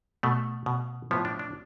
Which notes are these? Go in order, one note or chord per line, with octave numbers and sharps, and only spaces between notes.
B2 A3
B2
A2 F3 B3
D4
D4